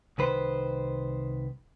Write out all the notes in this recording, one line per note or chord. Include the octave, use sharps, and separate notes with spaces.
C2 D#3 B4 C5